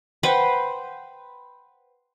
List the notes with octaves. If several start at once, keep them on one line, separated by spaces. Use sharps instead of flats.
B4 C5 F#5 G5